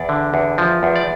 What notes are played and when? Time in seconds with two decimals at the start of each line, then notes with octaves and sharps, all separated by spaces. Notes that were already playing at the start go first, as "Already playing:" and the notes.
Already playing: E2 D5
0.09 D3
0.34 E2
0.58 F3
0.83 E2
0.96 D5